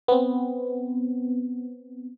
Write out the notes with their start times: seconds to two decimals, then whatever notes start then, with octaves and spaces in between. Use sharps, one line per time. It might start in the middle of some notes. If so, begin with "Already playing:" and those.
0.08 B3 C4